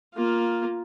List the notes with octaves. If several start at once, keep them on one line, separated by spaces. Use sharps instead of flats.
A#3 F4